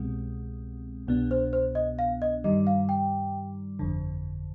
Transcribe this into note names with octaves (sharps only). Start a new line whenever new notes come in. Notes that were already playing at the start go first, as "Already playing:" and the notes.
Already playing: C2 B2 G#3 C4
C2 B2 B3 D4
C5
C5
D#5
F5
D#5
G2 D#3 G3 D#5
F5
G5
G1 F2 D3